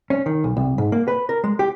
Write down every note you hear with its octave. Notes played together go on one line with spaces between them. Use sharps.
C#4
D#3
B1
C2
G#2
A#3
B4
A#4
G#3
G4